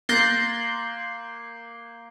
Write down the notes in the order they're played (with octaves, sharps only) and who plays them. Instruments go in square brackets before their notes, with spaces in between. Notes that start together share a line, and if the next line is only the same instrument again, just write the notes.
[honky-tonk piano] A#3 A6 A#6 [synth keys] C6 F#6 G6